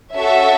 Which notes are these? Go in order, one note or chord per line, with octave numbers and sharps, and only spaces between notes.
C#4 F#4 A4 E5